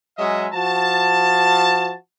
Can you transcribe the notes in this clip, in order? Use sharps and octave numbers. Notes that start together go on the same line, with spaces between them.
F#3 G#3 C#4 D#5 E5
F3 F#4 A5